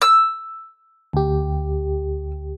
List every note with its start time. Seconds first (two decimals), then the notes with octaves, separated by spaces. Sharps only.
0.02 E6
1.13 D2 G4